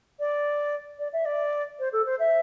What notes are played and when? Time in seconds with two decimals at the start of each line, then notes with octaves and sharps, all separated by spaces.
0.20 D5
0.99 D5
1.13 E5
1.25 D5
1.79 C5
1.93 A4
2.06 C5
2.19 E5